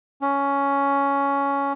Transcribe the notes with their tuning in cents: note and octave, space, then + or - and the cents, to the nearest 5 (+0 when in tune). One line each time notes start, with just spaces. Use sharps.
C#4 +10